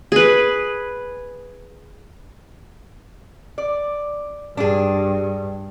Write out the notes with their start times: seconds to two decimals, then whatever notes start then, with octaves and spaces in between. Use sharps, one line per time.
0.12 G#4 B4
3.58 D5
4.57 G2 D4 G#4